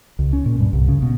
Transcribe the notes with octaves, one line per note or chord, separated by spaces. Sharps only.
C#2
C#4
A#2
G2
C2
C#3
B2